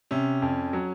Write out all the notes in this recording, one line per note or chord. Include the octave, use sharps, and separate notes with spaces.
C3 C#4
F2
F#3